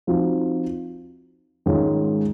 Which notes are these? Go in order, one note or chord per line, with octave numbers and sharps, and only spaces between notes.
F3 C4 D#4 F#4
G#2 D#3 G#3 C#4 F4